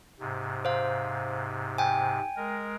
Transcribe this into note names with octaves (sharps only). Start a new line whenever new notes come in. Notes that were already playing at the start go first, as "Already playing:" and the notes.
G#2 C3
C5 F5
G5 G#5
G#3 A#4